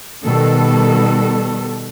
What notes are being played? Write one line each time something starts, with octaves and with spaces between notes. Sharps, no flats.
B2 D#3 G3 A4